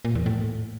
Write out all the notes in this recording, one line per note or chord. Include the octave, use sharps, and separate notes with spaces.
A#2
E2
A2